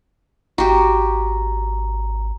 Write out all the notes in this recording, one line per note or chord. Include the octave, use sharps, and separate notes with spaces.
G#1 F#4 G4 A#5